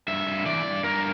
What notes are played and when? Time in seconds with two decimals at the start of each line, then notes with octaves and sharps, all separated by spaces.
0.08 G2 E5
0.27 G2
0.46 E3 D5
0.65 G2
0.84 G2 A#4